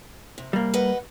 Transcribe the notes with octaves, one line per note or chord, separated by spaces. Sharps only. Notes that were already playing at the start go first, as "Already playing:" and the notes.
C3
G3 A#3
B4 D#5 F#5